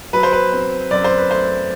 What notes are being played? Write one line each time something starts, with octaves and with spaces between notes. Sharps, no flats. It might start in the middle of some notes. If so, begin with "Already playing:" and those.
F#3 B4
C5
B4
C4
F#2 D5
C5
B4
A3 C5